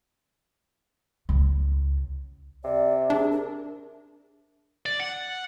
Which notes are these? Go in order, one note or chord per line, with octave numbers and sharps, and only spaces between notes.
C#2
C3 D5
D4 G#4
A#4
D5
F#5